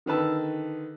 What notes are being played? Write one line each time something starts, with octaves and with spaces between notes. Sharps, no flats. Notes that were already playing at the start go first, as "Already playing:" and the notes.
D3 D#3 B4 A5 E6